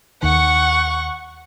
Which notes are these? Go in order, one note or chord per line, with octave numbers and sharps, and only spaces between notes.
D#2 D#3 F#5 C#6